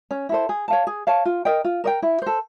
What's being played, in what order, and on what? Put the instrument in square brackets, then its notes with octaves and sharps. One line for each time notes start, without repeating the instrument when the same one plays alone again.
[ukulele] C#4
E4 A4 C5
G#4
C#5 F5 A5
G#4
C#5 F5 A5
F4
A#4 D#5 G5
F4
A#4 D#5 G5
E4
A4 C5